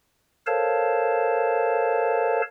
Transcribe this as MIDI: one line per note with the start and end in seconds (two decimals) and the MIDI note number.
0.47 2.42 69
0.47 2.42 70
0.47 2.42 72
0.47 2.42 73
0.47 2.42 77
0.47 2.42 81